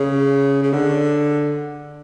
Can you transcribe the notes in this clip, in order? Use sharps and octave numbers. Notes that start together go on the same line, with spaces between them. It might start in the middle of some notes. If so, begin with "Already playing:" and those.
Already playing: C#3
C#3
D3